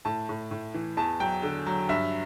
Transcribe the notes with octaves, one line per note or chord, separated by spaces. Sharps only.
A2 A5
A2
A2
E3
E2 A5
F#3 G5
D3
F#3
G2 E5